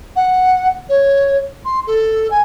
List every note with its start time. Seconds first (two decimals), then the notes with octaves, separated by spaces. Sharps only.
0.16 F#5
0.89 C#5
1.65 C6
1.87 A4
2.30 G#5